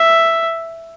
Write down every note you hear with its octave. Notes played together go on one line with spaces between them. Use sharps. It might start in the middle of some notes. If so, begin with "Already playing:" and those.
Already playing: E5